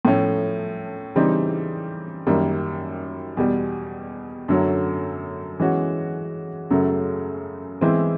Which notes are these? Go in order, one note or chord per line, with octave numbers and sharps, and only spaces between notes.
A2 F3 A3 C#4
C#3 E3 G3 C4 D#4
F#2 D#3 G3 A#3
E2 B2 G3
F#2 D3 F#3 A3 C#4
E3 G#3 C#4 F#4
F#2 C#3 F#3 A3
E3 G#3 C4 E4